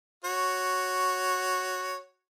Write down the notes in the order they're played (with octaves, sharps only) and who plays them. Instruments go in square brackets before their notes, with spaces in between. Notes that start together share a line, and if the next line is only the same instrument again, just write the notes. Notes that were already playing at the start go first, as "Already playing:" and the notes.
[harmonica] F#4 C#5